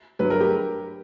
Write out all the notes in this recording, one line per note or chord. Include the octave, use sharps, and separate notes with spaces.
G1 G2 F#3 B4
A#4
G4